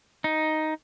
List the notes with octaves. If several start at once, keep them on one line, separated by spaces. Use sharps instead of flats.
D#4